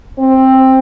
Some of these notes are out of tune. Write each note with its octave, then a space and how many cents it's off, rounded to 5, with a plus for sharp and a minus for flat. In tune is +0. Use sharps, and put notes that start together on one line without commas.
C4 +10